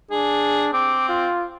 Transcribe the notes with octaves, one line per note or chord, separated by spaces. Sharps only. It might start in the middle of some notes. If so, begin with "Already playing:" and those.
D4 G#4
C4 D6
F4